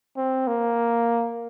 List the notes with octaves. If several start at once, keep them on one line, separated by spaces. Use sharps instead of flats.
C4
A#3